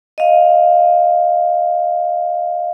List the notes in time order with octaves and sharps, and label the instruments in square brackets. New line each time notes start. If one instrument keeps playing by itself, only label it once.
[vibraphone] D#5 F5